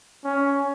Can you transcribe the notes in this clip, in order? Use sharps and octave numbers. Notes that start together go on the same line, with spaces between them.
C#4